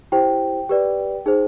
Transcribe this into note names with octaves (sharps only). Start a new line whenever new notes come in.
E4 G4 C5 G5
G4 B4 D5
D#4 G#4 C5